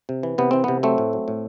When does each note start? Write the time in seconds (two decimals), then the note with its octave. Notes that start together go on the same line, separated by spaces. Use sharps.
0.09 C3
0.23 E3
0.38 C3 B3
0.51 E3 C4
0.64 C3 B3
0.83 F#3 A3 C4
0.98 A2
1.13 F#3
1.28 A2